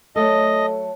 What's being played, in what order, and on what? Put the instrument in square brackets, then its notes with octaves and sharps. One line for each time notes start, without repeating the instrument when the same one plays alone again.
[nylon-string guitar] F#3 A3 A4 [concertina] D#5